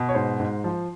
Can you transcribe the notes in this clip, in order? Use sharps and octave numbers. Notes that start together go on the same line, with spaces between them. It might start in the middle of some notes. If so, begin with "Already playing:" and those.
Already playing: B2
C#5
G#2 C5
G#2
F3